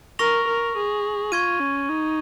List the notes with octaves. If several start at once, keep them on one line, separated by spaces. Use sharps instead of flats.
A#4 C#6 A#6 F7
A#4
G#4
F4 C#6 G#6 D#7
C#4
D#4